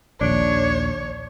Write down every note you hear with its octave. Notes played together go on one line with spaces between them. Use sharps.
A#1 D#2 D4 C#5